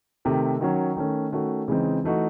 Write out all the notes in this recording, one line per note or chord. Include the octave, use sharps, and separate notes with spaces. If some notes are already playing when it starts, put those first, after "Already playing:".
C3 D#3 A3
D#3 F#3 C#4
D#3 A3 C#4
D#3 A3 C#4 F#4
C#3 E3 G#3 C4 D#4
E3 A3 D#4 F#4